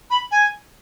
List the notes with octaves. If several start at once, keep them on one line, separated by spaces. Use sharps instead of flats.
B5
G#5